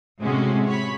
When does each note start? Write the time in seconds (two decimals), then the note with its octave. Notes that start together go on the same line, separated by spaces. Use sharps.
0.22 A2 C3 G#3 C#4 F#4
0.67 C#5 B5